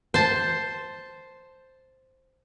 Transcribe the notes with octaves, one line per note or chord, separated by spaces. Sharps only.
C5 A5